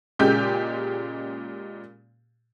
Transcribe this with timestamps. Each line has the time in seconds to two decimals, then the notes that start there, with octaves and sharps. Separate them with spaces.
0.19 A#2 C#3 G#3 G4 G6